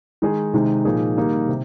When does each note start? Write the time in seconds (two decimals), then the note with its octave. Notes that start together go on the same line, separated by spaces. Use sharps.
0.22 D#3 G#3 D#4 G#4
0.54 C3 D#3 G#3 D#4
0.85 A#2 F3 A#3 D#4 G#4
1.17 D#3 G3 A#3 D#4
1.49 C3